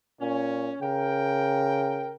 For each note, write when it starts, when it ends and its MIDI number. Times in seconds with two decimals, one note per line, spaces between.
0.21 0.71 46
0.21 0.77 61
0.82 2.16 49
0.82 2.13 70
0.82 2.13 79